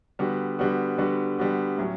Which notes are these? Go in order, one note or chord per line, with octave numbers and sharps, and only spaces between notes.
D3 G3 B3 F#4
D3 G3 B3 F#4
D3 G3 B3 F#4
D3 G3 B3 F#4
A2 F#3 C#4